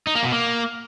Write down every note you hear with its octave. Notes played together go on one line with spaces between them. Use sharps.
D#4
A#3
B2
A#3